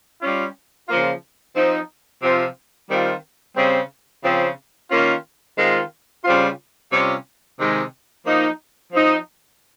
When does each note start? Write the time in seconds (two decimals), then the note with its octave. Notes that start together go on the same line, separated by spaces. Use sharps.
0.22 G3 C#4 F4
0.89 C#3 F3 A#3 F4
1.56 F3 C4 D#4
2.23 C3 F3 C4 F4
2.90 D#3 G3 C4 F4
3.57 C#3 G3 C4
4.24 C#3 F3 C4
4.91 D#3 A#3 C#4 F4
5.58 D#3 G#3 C4 F4
6.25 C#3 G3 C4 F4
6.91 C3 G3 C#4 F4
7.59 C3 D#3 G#3
8.26 F3 A#3 D#4
8.93 F3 C4 D#4